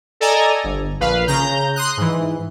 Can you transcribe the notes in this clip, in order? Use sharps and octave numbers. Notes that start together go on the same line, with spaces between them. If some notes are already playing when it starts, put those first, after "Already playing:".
A4 D5 D#5 G#5 A#5
G1
A#1 B4 F5
C#3 A#5 G6
C6 D#6 F#6
G#2 E3